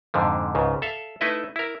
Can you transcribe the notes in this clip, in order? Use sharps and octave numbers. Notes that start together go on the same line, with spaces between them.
F2 G#2 D3 F3
C#2 G#2 C#3
A4 E5 F5
A3 D#4 E4 B4 D#5 E5
E4 A#4